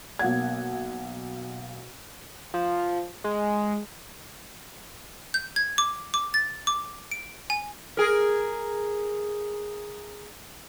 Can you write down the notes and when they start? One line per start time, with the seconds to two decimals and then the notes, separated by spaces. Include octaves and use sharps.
0.19 B1 A#3 F#5 G#6
2.54 F3
3.24 G#3
5.34 G6
5.56 G#6
5.78 D6
6.14 D6
6.34 A6
6.67 D6
7.11 D7
7.50 G#5
7.97 G#4 A#4